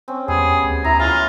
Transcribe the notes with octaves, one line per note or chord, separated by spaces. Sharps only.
C4 C#4
E2 G3 G#3 B3 G#4
D2
E4 A#5 C6
E3 F#3 F4 G#5